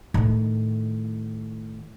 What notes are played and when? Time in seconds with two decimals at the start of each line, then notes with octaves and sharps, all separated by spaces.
0.14 A2 D#3